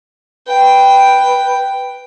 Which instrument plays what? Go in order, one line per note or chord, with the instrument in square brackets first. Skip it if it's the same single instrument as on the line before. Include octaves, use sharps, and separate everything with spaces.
[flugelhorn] B4 [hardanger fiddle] G5